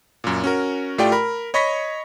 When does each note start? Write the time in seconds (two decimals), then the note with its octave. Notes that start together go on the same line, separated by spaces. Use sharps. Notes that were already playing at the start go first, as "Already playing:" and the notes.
0.24 F#2 A#2
0.44 C#4 F#4 A#4
0.98 A2 A3 F4 G4 D5 G5
1.12 A#4 B5
1.54 C#5 D#5 B5 C#6 A#6 B6